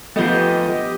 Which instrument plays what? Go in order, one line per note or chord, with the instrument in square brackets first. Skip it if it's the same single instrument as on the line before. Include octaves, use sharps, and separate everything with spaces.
[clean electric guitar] F3 A3 [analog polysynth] B3 G4 D#5